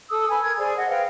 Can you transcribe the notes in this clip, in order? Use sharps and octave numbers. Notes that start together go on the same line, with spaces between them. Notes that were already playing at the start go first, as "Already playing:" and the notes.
A4 D#6 E6
B4 G#5
A#4 G#6
G#4 C5 D5 G#5
D#5 F#5
B4 C5 F5 G5